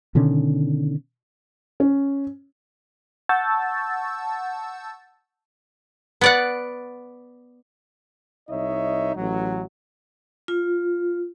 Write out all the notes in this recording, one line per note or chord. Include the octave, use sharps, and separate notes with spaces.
B2 D3 D#3 C#4
C#4
F#5 A5 C#6 E6 G6 A6
B3 D5 F#5
C2 D#4 C#5 D#5 E5
A1 F#3
F4